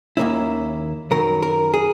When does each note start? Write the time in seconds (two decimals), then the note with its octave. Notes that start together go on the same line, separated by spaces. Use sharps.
0.17 D#2 D#3 A#3 C#4 E4
1.11 F#2 D#3 F#3 A#4
1.43 A#4
1.74 G#4